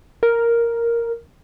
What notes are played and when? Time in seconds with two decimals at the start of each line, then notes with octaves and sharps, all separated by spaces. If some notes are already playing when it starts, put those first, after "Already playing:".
0.23 A#4